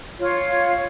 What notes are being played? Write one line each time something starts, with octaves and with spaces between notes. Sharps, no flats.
F4 C#5